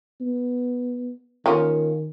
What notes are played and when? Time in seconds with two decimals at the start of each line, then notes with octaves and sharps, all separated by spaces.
0.21 B3
1.46 D#3 F3 A#3 C#4